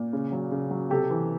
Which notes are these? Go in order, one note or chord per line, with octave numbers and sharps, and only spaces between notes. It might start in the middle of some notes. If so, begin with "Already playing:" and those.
Already playing: A#2
C#3
F#3
C#3
F#3
C3 G4 A4
E3